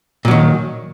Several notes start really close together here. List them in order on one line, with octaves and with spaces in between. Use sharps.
A#2 F#3 D#3